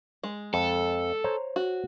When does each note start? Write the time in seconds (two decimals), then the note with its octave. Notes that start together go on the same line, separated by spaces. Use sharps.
0.23 G#3
0.54 F2 A4
1.24 C5 C#5 A#5
1.56 F#4